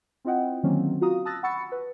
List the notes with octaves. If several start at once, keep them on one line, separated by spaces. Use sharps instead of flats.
C4 E4 F4 D#5 F#5 G5
D3 D#3 F#3 A#3 C4 C#4
F4 F#4 F5 A#5 D#6
A5 D#6 E6 F#6 A6 A#6
F#5 B5 C#6 E6 A6 C#7
B4